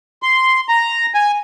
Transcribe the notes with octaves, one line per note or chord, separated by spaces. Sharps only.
C6
A#5
G#5